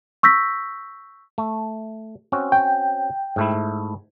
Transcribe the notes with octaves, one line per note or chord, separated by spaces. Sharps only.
C#6 E6 G6 A#6 B6
A3
C4 C#4 F#4
G5
G#2 A3 E4